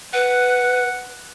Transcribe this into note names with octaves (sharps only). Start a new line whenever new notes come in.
B4 F#5